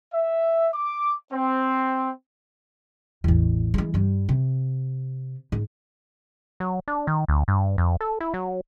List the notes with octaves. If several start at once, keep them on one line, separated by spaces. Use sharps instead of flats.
E5
D6
C4
A1 E2
E3 G#3
G2 G3
C3
G#2
F#3
D4
D#3
D2
G2
F2
A4
E4
F#3